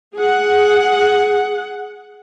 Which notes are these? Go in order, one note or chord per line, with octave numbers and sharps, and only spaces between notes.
G#4 F#5